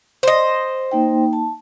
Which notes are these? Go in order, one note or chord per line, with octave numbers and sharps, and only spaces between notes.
C5 D#5
A#3 D#4 G5
A5